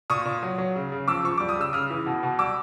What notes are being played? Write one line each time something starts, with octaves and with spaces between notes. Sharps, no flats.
A#2 C#6 D#6
A#2
F#3
F#3
C#3
C#3
F3 D6 E6
F3 C#6
G3 D6
D#6
C#3 E6
C#3 D#6 F6
E3
B2
B2
G3 D6 E6